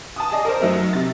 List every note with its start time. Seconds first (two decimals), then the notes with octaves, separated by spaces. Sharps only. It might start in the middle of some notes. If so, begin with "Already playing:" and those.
0.16 A5 D#6
0.32 G#4 D5 D#5
0.45 A#4 C5
0.61 F#2 F#3 A3 D#4
0.93 C3 A6